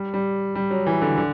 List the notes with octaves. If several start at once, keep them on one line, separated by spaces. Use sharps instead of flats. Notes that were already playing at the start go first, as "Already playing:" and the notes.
Already playing: G3
G3
G3
F#3
E3
D3
D3